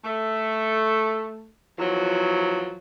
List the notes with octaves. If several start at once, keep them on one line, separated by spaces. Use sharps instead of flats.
A3
E2 F3 F#3